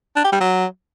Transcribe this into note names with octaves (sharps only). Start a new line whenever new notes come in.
D4
G4
G3
F#3